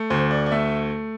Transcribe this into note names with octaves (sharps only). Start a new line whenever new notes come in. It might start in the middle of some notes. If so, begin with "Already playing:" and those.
Already playing: A3
D2 C5
D5
D5
A3 E5